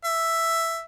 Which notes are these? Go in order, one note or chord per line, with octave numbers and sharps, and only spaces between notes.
E5